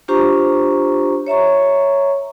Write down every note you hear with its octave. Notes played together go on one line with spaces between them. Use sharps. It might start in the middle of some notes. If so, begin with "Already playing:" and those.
D4 F4 G4 C5 A#5 C#6
C#5 E5 A#5 C#6